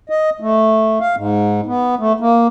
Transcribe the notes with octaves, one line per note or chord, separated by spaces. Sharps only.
D#5
A3
F5
G#2
B3
A3
A#3